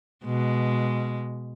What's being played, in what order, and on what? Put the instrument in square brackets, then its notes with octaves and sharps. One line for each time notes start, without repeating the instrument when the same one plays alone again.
[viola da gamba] B2 G#3